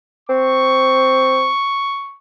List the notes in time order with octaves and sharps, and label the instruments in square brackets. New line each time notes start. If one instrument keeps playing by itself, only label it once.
[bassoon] C4 [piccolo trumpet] C#6